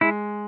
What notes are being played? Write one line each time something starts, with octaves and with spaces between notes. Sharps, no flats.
G#3 E4